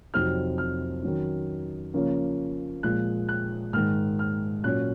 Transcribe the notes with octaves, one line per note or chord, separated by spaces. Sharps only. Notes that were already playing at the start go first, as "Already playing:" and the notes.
F2 C3 F#3 C4 D#4 F6
F6
D#3 F#3 C#4
C#3 F3 A#3 C#4
A#2 F3 G#3 F#6
F#6
G#2 D#3 G#3 F6
F6
A#2 F#3 C#4 F#6